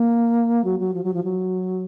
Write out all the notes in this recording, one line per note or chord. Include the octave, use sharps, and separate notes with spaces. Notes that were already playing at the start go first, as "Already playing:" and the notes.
Already playing: A#3
F#3
F#3
F3
F#3
F3
F#3